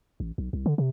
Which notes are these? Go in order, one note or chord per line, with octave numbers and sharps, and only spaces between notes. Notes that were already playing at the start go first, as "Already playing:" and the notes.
A1
B1
C2
D3
C3